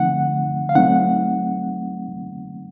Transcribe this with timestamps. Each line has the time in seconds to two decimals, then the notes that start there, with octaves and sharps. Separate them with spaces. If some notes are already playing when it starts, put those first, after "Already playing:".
Already playing: D3 F3 A3 C4 D#4 F#5
0.69 F5
0.75 F#3 A3 C4 D#4 F#5